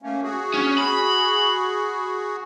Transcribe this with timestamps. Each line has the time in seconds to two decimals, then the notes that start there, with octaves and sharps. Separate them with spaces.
0.02 A3 A#3 C#4
0.23 F#4 G#4
0.54 C#4
0.78 B5